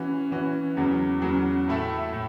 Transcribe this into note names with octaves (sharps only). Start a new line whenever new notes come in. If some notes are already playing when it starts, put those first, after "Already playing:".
Already playing: E3 C#4 F#4
E3 C#4 F#4
E2 C#3 F#3
E2 C#3 F#3
A2 A3 E4 A4
A2